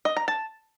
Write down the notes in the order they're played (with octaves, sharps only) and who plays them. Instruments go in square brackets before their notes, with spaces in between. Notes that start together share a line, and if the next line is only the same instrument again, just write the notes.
[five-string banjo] D#5
A#5
A5